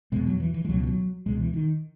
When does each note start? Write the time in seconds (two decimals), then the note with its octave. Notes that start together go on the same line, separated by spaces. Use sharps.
0.12 E2 B2 G#3
0.27 F#3
0.40 E3
0.54 E3
0.65 G#3
0.69 C#2 B2 F#3
0.83 E3
0.87 F#3
1.26 C#2 B2 G#3
1.39 E3
1.54 D#3